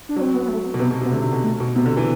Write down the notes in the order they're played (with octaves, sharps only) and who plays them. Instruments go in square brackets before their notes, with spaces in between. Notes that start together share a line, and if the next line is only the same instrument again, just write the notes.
[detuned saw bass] D4
[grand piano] F#3 [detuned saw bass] C4
[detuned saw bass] B3
A3
[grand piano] B2
[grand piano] C3 [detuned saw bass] B3
[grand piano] B2
C3
[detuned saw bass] B3
[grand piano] D3 [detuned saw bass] A3
[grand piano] C3
B2
[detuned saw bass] A3
[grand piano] B2
[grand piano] C3 [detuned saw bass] B3
[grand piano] D3
E3